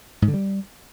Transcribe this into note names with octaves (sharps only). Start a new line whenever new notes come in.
G#2
D3
G3